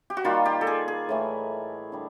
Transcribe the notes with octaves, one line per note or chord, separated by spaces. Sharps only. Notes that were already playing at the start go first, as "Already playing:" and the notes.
G4
F#4
D#3 G3 A#3 F4
G4
A4
G#4
G#4
A2 E3 A3
D3 G3